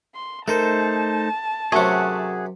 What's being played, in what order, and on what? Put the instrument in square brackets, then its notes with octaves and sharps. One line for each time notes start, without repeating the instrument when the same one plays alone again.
[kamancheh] C6
[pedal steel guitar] A3 D#4 C5 [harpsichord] A4 A#4 [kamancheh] A5
[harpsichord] F#2 C3 [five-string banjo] F#3 A3 [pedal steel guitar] G#4 F#5